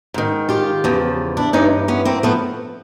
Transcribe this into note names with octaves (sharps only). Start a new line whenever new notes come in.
G#2 D#3
F4 G4
E2 C#3 F3
D4 E4
G2 E3 C#4 D#4
B3 C#4
A#3 C4
F3 A3 B3